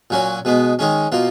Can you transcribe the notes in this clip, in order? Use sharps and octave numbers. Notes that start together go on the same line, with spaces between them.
A#2 F#3 C#4 F#4
B2 G#3 B3
D#3 G#3 C#4
B2 A#3 F4